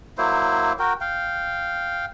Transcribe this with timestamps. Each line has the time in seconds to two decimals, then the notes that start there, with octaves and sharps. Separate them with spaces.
0.18 F#3 A#3 E4 C5
0.79 F#4 A#4 G5
1.01 F5 G5